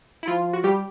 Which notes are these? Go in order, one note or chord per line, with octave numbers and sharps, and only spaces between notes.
E4
F3 F4
F#4
G3 G4